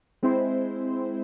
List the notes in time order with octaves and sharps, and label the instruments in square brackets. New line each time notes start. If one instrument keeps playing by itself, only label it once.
[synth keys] G#3 C4 E4 C5